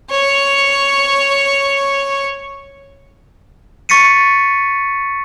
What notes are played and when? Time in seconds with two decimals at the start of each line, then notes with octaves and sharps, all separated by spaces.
0.11 C#5 C#6
3.89 C#6 A6 B6 C#7 D#7